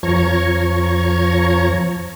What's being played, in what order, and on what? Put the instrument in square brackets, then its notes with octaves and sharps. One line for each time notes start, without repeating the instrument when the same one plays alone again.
[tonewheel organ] F2 F3 C#5 A#5 C#6 G#6